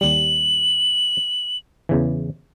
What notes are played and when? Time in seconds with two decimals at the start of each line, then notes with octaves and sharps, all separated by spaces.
0.01 D#2 G3 F#7
1.89 E2 C#3 E3